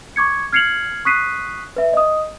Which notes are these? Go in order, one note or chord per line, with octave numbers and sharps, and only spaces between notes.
C#6 D6 G#6 C#7
F6 G#6 C7 C#7 F7 F#7
C#6 D#6 F#6 B6 C7 D#7
B4 E5
D#5 D#6